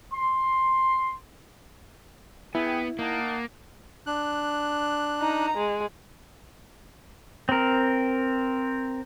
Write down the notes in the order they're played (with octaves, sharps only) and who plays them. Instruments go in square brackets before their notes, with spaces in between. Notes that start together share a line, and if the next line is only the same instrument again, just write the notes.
[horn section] C6
[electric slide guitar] B3 [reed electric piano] E4 [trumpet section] G#4 G5
[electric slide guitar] A#3 [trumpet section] D#4 F#5 A5
[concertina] D4 F#6
[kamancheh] D#4 A#5
G#3
[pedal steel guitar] C4 A#4